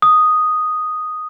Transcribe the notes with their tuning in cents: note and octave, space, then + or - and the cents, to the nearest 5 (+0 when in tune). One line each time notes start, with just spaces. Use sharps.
D#6 -5